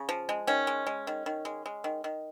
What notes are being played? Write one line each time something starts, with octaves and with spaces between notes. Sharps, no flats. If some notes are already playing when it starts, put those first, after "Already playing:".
Already playing: C#3
F3
G#3
D#3 C#4
G#3
G#3
D#3
D#3
G#3
G#3
D#3
D#3